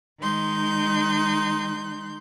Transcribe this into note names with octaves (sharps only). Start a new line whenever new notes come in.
D#3 G#3 D#4 C6 G6